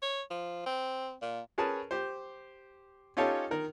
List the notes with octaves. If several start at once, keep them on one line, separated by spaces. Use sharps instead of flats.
C#5
F3
C4
A#2
C#4 G#4 A#4 B4 A5
G4 C5
C#4 D#4 F4 G4 A4 C#5
D#3 A#4